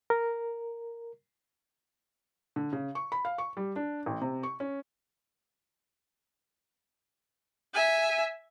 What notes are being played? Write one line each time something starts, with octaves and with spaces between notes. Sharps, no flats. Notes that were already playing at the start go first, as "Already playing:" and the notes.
A#4
D3
C#3
C#6
B5
F5
C#6
G3
D4
A1
C3
C#6
C#4
E5 G#5